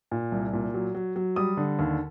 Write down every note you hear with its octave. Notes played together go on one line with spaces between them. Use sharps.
A#2
C2
A#2
F#3
F#3
F#3
G3 D#6
D3
D#2